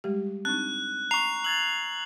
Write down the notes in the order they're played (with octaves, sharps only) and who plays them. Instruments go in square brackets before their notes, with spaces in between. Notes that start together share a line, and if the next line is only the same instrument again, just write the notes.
[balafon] G3 G#3 G4
[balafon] C4 D4 D#4 [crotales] F#6
[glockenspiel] A#5 C#6 [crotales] C7 F7
[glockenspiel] E6 G#6 A6 [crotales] F#7